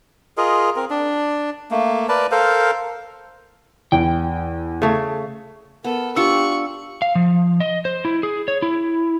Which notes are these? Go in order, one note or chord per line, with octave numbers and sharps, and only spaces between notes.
F4 G#4 A#4 D#5
C4 A#4
D4
A3 A#3
A#4 B4 D5 A5
A4 A#4 C5 F5
E2 G5
C#3 A3
B3 A4 A#4
D4 F4 G4 C#6 E6 C#7
F5
F3
D#5
C5
E4
G#4
C#5
E4